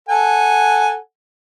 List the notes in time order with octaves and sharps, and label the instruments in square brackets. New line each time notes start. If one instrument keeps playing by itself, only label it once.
[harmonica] A4 F#5 G#5